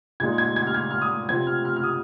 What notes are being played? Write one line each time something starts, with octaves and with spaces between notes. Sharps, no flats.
A#2 G#3 D#4 G#6
G#6
G#6
F6
G#6
F6
D#6
C3 F3 C4 G#6
F6
F6
F6
D#6